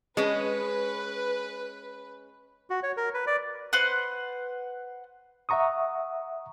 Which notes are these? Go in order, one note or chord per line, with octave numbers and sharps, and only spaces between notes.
G#3 C#4 B4
F#4
C#5
A#4
B4
D5
B4 C5 F#5
E5 F#5 A#5 C#6 D#6